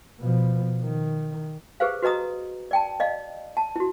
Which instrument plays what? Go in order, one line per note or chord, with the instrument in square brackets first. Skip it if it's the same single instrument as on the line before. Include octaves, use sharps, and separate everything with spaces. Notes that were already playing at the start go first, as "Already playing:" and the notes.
[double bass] B2 F3
D#3
[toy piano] G4 G#4 B4 C5 F5
F#4 B4 D#5 A#5 D#6
D5 G5 A5
D5 D#5 F5
A5
E4 F#4